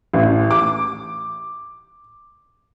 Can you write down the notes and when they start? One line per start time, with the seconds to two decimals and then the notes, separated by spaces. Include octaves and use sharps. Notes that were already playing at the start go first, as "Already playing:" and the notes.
0.14 A1
0.51 D6